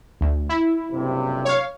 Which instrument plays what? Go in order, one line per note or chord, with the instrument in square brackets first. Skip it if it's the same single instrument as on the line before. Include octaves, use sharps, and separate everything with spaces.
[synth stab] D2
E4
[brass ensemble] F#1 G2 C3
[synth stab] C#5 F5